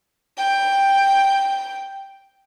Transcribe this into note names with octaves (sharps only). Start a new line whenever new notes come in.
G5